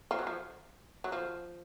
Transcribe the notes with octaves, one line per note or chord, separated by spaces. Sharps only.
F3
F#3
F3
F#3
F3